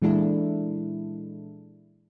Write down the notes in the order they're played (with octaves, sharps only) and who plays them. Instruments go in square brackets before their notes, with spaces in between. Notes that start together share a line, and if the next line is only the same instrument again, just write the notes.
[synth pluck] A#2 E3 G#3 D4 E4 A4